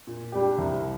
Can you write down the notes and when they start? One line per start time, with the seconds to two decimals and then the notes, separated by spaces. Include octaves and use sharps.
0.07 A#2
0.32 G3 D4 G4
0.58 C2